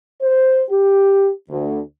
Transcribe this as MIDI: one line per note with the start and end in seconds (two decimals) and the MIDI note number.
0.22 0.61 72
0.70 1.29 67
1.50 1.80 38